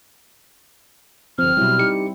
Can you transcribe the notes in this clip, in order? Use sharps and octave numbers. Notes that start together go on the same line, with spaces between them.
G1 F3 C4 F6
B2 F#3 G3 E4
D#4 G4 C#7